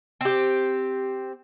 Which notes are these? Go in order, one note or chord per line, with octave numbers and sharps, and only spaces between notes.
C4 G4